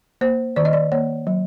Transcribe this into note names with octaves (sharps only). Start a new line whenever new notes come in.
A#3 C5
D#3 D5
D#5
D5
A#3 C#5
F#3